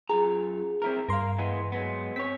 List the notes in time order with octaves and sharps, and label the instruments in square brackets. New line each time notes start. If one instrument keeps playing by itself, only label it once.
[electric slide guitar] F#2 F4 A#5 [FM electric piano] G#4
[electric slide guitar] C4 E4 A#4
[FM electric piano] G2 C6 [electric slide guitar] A#4 F5
[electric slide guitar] E3 G#3 B3
F#3 G#3 B3
[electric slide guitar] C4 C#5 [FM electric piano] B6